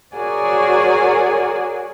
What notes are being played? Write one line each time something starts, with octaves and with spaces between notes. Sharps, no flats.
F#4 G#4 A#4 C#5 D5 G#5